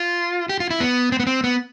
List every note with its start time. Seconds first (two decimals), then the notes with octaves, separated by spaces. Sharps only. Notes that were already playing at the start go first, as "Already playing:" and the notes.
Already playing: F4
0.49 G4
0.60 F4
0.70 E4
0.80 B3
1.12 C4
1.20 B3
1.27 C4
1.44 B3